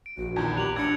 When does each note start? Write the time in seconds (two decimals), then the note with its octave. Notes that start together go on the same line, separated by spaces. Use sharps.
0.06 D7
0.17 A#1 F#4
0.36 E2 D#3 F4 B5 G#6
0.56 G4 F#6 F7 F#7
0.76 A1 D4 G#6 C#7